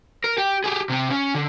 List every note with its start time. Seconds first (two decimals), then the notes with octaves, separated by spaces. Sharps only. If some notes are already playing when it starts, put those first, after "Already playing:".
0.24 A#4
0.38 G4
0.64 G4 G#4
0.90 C3 C4
1.11 C#4
1.35 D3